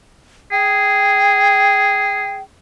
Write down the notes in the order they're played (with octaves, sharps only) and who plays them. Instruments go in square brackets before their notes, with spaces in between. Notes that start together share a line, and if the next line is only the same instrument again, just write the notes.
[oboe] G#4 [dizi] G5